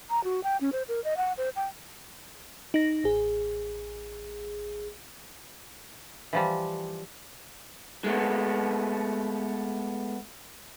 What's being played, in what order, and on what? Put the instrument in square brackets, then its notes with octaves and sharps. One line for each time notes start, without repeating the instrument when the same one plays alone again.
[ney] A#5
F#4
G5
C#4
C5
A#4
D#5
F#5
C5
G5
[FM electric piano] D#4 A#6
A1 G#4
[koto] E3 F3 G3
[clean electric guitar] G#3 A3 B3